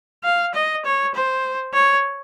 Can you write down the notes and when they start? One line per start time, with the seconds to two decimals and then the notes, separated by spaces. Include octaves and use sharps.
0.24 F5
0.54 D#5
0.85 C#5
1.15 C5
1.74 C#5